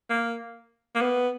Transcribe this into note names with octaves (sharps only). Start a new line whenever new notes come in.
A#3
A#3
B3